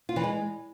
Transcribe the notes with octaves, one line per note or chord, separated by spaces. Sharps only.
F4
E3
G#3